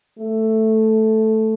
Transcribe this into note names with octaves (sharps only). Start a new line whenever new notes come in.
A3